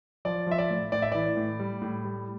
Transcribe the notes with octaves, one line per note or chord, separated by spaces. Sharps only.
F3 D5
F3 E5
D5
A2
A2 D5
E5
E3 D5
A2
G3
A2
G3